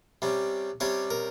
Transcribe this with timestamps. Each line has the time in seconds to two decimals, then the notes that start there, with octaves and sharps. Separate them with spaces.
0.22 C3 G3 C#4
0.80 C3 G3 C#4 C#5
1.10 A#4